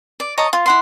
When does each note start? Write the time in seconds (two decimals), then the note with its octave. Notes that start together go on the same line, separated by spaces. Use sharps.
0.20 D5
0.38 C#5 D#5 A5 A#5
0.53 F4
0.66 E4 F#5 C6